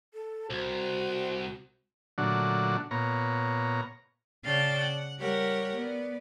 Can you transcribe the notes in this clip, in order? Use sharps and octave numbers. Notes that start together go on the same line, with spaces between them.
A4
C2 F#4 C5
A#2 D3 F#3 A3 D4 F#4
A#2 B3 C#5 A#5
C#3 D5 F5 G5 A5 A6
F#5
G3 G4 A#4 C#5 F#5
B3 D5